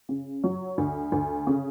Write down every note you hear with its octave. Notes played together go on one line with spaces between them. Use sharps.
C#3
F#3
D2
D2
C#3